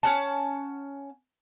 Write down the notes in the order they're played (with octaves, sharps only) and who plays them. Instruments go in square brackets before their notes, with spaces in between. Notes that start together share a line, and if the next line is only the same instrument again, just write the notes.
[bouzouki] C#4 F#5 A5